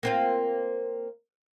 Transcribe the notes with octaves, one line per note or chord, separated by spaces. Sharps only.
A#3 C4 F4